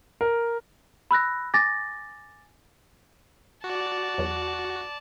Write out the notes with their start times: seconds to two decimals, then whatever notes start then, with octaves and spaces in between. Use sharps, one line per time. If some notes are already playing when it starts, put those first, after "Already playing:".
0.21 A#4
1.11 B5 E6 F#6 A#6
1.54 G#5 D6 A6 A#6
3.64 F#4 D5 A5
4.18 E2 F#3